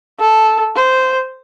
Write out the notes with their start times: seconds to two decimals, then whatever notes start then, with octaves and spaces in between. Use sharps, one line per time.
0.19 A4
0.75 C5